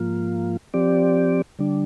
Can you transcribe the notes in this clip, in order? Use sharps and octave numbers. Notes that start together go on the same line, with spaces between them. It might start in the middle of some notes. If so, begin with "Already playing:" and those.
Already playing: G#2 F3 A#3 F4
F3 C4 G4 D5
D3 G3 D4